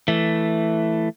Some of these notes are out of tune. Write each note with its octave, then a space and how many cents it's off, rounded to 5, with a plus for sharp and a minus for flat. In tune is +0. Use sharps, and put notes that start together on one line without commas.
E3 +0 A3 +0